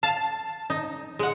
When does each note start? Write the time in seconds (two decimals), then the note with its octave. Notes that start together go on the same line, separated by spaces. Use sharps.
0.03 F5 A5
0.70 D#4
1.19 G#3 F#5